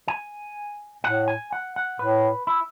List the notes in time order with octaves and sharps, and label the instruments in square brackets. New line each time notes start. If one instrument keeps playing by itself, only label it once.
[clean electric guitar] G#5
[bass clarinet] A2 [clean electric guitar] F#5
[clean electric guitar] G#5
F#5
F#5
[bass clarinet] A2 [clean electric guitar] B4
[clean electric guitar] E4